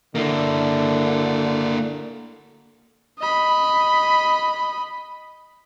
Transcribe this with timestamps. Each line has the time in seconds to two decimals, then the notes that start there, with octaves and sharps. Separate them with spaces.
0.15 D3 A#3 E4
3.19 D#5 B5